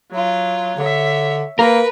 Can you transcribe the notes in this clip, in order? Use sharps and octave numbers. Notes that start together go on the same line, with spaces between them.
F#3 F4
D3 C#5 E5
A#3 A#4 B4